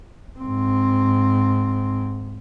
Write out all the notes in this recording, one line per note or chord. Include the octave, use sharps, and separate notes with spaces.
G#2 C4